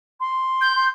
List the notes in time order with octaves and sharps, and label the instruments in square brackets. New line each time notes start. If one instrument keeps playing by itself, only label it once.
[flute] C6
[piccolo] G6
[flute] C6